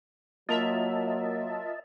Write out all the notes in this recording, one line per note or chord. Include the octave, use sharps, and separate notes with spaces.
F#3 A#3 F4 A#4 D#5 E5 A5 F7